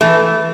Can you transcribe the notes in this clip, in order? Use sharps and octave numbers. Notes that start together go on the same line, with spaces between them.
E3 A3